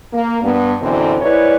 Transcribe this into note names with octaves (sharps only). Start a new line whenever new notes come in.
A#3
G2 B3
F#2 B2 D3 E3 C4
G#2 E4 B4 C#5 D5